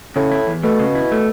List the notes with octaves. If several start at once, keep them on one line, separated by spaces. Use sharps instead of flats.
A2 C#3
E4
E2
B2 A3
C#3
E4
A3